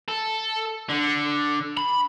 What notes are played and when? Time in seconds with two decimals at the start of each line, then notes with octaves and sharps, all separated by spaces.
0.09 A4
0.89 D3
1.77 B5